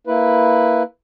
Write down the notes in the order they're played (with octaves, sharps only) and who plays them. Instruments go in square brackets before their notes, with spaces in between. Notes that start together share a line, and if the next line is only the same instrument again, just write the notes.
[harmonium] A#3 E4 B4